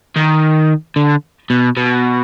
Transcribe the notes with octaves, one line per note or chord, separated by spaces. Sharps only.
D#3
D3
B2
B2